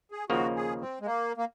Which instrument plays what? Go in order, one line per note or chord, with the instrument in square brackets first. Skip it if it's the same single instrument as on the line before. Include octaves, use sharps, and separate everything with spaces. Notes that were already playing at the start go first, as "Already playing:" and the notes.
[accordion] G#4
[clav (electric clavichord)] D#2 C#3 F3 A#3 [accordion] F#4
[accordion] G#4
C4
G#3
A#3
A#3